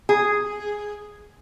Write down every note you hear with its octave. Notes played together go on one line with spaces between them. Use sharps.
G#4